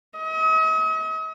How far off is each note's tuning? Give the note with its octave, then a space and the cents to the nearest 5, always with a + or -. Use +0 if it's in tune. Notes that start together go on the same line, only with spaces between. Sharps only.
D#5 +45